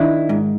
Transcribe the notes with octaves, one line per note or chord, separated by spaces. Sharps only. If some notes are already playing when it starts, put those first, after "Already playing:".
Already playing: D#3 D4 E4
G#2